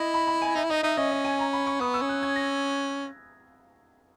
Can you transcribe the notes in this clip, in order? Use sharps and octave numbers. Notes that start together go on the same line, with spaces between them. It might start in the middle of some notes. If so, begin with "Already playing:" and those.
Already playing: E4 D#5
B5
B5
G#5
D#4 E5
E4
D#4 D#5
D#4 E5
C#4 D#5
D#5
G#5
A#5
B5
C#6
B3 D#6
E6
C#4
F#6
G#6
A#6